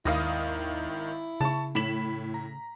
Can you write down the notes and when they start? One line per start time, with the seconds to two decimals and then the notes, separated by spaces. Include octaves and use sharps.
0.05 G#1 D#2 D#3 E4 F5 D#6 A#6
1.41 C#3 A5 C#6
1.75 A2 B5 B6 E7 F#7
2.34 A#5